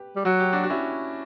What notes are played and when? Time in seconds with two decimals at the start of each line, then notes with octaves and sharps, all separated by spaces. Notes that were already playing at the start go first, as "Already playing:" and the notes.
Already playing: G4 B4
0.16 G3
0.25 F#3 F#4
0.40 G4
0.53 D4 F#4
0.64 F#4
0.70 C#4 E4